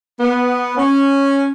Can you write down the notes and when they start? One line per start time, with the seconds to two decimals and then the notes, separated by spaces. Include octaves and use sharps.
0.19 B3
0.77 C#4